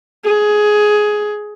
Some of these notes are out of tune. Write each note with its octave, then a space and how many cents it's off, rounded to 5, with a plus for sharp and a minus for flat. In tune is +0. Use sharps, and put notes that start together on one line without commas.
G#4 +15